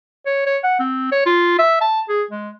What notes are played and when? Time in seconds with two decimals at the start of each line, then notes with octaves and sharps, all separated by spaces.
0.26 C#5
0.46 C#5
0.64 F#5
0.80 C4
1.12 C#5
1.26 F4
1.59 E5
1.81 A5
2.09 G#4
2.31 G#3